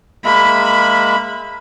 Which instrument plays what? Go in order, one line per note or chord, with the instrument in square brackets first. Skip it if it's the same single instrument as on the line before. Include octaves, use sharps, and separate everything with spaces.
[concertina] G#3 A#3 E5 [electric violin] B5